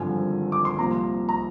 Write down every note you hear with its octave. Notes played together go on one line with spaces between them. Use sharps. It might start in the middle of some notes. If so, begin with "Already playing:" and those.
Already playing: G#1 G2 D3 F3 G#5
D6
C6
C2 A#2 F3 A#5
A#5